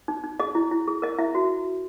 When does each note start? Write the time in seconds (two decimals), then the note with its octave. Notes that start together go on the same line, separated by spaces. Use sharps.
0.08 D#4
0.24 D#4
0.40 G#4 D#5
0.55 E4
0.71 E4
0.87 G#4
1.02 A#4 D#5
1.19 E4 E5
1.35 F#4